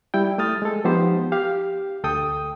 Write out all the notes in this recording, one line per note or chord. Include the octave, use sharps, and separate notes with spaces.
G3 E4 G5
A3 E4 D#6 F6 A6
G#3 A4
F3 B3 D#4 G4 C5
G4 F5
D2 A4 G5 D#6